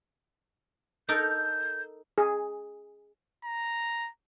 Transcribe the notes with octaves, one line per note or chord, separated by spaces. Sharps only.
D#4 A4 A#4 G6
G#4
A#5